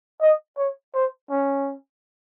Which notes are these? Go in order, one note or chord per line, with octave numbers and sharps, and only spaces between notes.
D#5
C#5
C5
C#4